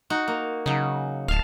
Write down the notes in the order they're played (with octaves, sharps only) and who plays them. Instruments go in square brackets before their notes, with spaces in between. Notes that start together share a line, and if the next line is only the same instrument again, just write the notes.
[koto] D#4 F#4
A#3
[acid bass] C#3 [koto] F#3 D#4
[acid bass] D1 [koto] F5 A5